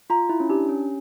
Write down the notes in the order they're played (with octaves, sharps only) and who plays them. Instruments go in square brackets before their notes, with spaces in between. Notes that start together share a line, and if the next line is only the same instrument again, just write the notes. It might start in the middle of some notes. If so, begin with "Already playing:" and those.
[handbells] F4 [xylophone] A#5
[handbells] E4
C#4
[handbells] D4 [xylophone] G4
[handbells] C#4